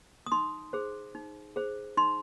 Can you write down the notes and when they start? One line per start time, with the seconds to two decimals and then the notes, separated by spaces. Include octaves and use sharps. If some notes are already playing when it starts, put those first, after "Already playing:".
0.26 D#6
0.32 D#4 C6
0.73 G#4 C5
1.15 D#4
1.56 G#4 C5
1.97 D#4 C6